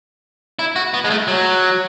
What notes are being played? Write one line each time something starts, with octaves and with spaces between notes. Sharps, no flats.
E4
F#4
B3
G#3
A3
F#3